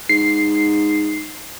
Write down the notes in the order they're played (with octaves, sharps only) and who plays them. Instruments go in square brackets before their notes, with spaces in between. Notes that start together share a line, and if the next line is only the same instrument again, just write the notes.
[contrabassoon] G#2 [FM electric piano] C7